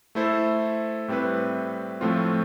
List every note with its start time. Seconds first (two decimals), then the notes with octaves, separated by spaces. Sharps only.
0.15 A3 E4 A4 C5
1.08 A2 G3 C4 E4 B4
2.01 A2 F3 A3 C4 F4